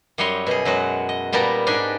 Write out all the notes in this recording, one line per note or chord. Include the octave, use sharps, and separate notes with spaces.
F#2 G3 C#5 D#5 C6
B2 G#4
F#2 F#3 G#3 F#4
D#5
A#2 G3 B3 A#4 A5 A#5
G#2 D4 D#4 G4 G#5